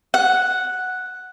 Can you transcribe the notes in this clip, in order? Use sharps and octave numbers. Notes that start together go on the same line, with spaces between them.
F#5